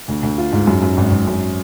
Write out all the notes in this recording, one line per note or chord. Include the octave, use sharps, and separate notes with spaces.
D2
D2
F4
G#2
F#2
F#2
G#1
G#1
F#2